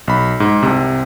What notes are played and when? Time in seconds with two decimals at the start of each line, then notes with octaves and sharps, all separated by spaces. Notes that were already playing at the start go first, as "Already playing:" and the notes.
0.08 B1 B5
0.40 G#2
0.63 C2 C3